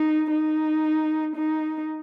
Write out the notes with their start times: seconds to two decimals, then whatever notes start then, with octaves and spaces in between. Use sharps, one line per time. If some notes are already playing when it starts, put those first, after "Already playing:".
Already playing: D#4
0.31 D#4
1.36 D#4